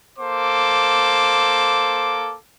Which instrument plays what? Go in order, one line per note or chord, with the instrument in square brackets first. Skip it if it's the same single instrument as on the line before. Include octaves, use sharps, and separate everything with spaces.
[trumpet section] A#3 A4 C5 D6